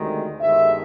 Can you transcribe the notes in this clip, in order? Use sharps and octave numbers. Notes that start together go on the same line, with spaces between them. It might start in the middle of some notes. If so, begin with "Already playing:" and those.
Already playing: D2 C3 D#3 G#3
G1 G2 D#3 G#3 E5